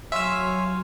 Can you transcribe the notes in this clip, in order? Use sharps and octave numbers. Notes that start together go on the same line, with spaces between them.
F#3 C#5 E5 F5 G#5 C6 E6